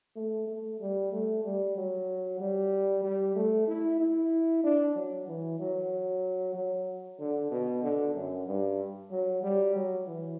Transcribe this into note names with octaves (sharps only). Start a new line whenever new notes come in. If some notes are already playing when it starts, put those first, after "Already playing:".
A3
A3
G3
A3
G3
F#3
G3
G3
A3
E4
E4
D4
F#3
E3
F#3
F#3
D3
B2
D3
F#2
G2
F#3
G3
F#3
E3